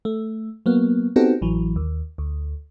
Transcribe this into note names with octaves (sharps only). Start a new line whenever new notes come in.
A3
F#3 A#3 B3
B3 C4 D#4 F#4 G4 A4
A1 E3 F#3
D#2
D2